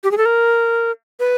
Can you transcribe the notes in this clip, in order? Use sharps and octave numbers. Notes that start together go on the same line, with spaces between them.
G4
G#4
A4
A#4
B4